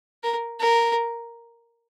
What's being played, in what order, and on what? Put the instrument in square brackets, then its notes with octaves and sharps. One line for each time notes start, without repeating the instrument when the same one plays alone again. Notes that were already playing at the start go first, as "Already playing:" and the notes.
[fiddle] A#4
A#4